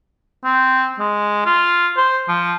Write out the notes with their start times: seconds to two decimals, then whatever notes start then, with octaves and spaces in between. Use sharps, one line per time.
0.44 C4
0.99 G#3
1.46 F4
1.97 C5
2.28 F3